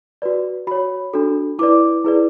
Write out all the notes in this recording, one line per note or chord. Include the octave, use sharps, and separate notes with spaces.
F#4 B4 D5
F#4 C#5 B5
D4 F#4 A4
E4 B4 D5 D6
E4 G#4 B4 D5